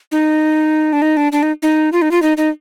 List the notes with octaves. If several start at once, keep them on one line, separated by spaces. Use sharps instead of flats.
D#4
D4
D#4
D4
D4
D#4
D#4
F4
D#4
F4
D#4
D#4